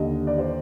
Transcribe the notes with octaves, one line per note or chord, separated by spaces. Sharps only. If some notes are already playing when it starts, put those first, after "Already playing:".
Already playing: D#2 D3 D#5
D5
C5